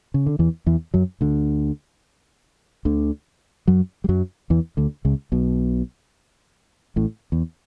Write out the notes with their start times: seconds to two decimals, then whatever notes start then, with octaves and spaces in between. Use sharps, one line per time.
0.14 C#3
0.26 D3
0.39 E2 E3
0.66 E2 E3
0.94 F#2 F#3
1.21 D2 D3
2.85 D2 D3
3.67 F#2 F#3
4.04 G3
4.09 F#2 F#3
4.50 E2 E3
4.77 D2 D3
5.05 C#2 C#3
5.32 B1 B2
6.96 A1 A2
7.32 E2